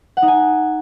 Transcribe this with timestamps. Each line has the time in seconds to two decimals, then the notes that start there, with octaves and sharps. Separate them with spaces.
0.17 F#5
0.22 D#4
0.28 G#5